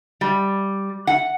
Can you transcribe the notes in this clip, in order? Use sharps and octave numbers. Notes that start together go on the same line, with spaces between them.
G3
F#5